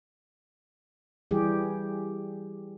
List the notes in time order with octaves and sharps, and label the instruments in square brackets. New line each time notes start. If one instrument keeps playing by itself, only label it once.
[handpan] E3 G3 G4 G#4